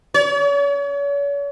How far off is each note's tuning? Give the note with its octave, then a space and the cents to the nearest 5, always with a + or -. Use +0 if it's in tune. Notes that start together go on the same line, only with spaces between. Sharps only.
C#5 +40